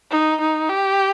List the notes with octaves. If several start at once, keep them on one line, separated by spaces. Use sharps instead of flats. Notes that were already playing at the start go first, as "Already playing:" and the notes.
D#4
D#4
G4